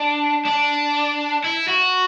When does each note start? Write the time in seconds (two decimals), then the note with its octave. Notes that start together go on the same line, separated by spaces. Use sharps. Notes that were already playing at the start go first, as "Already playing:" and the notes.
Already playing: D4
0.45 D4
1.44 E4
1.68 F#4